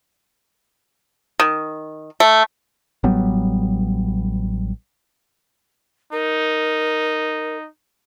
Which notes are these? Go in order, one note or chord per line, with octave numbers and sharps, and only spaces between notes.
D#3
A3
A1 F#3 G3 B3
D#4 A#4